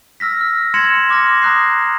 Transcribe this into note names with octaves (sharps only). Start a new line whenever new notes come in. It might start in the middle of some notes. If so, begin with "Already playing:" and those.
E6 F6 A#6 B6
F6
C6 G#6 A#6 C#7 E7 F#7
C6 D6 F6 A#6
A#5 D#6 F#6 G6 C7